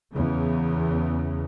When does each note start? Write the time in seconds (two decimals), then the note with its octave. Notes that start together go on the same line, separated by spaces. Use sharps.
0.13 E2 C#3